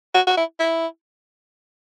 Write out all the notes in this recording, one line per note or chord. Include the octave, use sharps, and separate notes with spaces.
F#4
F#4
E4
E4